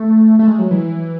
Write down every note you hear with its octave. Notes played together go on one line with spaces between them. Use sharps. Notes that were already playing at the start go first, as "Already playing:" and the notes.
Already playing: A3
A3
G#3
F#3
E3